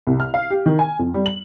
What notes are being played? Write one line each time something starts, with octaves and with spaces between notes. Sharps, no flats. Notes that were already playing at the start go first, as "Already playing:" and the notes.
C2
F6
F5
G4
D#3
G#5
F2
G3
F#7